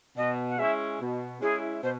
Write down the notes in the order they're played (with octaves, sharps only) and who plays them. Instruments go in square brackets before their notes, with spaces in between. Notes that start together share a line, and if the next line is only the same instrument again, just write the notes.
[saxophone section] B2 [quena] D#5
[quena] F#5
[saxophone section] G#3 C#4 E4 [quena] E5
[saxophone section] B2
[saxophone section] G#3 C#4 E4 [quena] G#4
[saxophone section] B2 [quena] C5